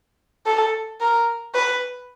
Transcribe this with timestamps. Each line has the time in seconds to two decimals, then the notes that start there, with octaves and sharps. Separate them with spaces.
0.46 A4
1.00 A#4
1.55 B4